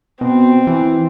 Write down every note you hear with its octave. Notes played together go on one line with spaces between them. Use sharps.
B2 C4
E3